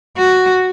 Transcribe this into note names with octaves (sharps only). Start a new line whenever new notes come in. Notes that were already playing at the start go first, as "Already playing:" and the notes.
F#4